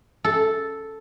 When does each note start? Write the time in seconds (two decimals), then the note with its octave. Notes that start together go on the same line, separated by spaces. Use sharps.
0.24 A4